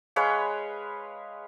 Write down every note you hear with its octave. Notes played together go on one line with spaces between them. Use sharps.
G#3 B4 C#5 F5